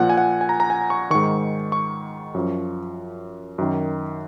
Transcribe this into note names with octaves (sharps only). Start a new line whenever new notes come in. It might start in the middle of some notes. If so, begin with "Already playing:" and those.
Already playing: A#2 F3 F#5
G#5
F#5
G#5
A#5
A#5
G#5
C#6
G#2 D#3 C#6
C#6
F#2 F3
F#2 D#3